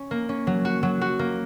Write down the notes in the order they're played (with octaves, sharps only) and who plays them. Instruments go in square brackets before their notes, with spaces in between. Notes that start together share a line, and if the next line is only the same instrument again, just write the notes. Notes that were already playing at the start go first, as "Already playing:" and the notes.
Already playing: [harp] C#4
A#3
C#4
F#3
F#4
F#3
F#4
A#3